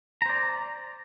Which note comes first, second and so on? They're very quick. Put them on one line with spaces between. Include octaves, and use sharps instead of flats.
A#5 C5 D5